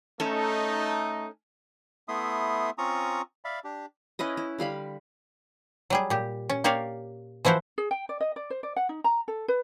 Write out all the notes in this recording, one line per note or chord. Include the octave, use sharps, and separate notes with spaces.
A3 C#4 D#4 A4
A3 B3 E4 E5 C6 D#6
C4 C#4 F4 A#5 C#6 D#6
D5 E5 F5 B5
D4 G4
C#4 E4 B4 D#5
E4
D3 G3 F5 B5
F#3 G3 G#4
A#2 G4
C#4
A#3 G4 A#4 C#5 D5 F5
E3 F3 E4 F#4 C5
G#4
G5
D5
D#5
D5
C5
D5
F#5
D#4
A#5
A4
B4